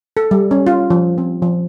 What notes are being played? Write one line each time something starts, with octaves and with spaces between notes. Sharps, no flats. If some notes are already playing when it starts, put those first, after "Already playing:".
A4
G3
C#4
F4
F3
C4
F3